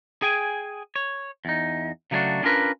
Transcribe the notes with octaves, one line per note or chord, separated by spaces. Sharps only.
G#4 G5 G#5
C#5
E2 D#4
C#3 F#3 A3 C#4 D4 F#4
C#4 D4 F4 A#4 B4